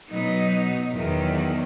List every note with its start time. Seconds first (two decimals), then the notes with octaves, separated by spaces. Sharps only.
0.10 B2 F#3 B3 D#4
0.95 E2 D#3 F#3